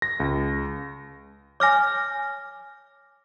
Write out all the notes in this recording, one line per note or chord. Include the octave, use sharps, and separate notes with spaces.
A#6
C#2
C#5 G#5 D6 F6 A#6